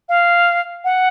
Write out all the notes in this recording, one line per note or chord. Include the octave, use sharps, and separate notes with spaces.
F5
F#5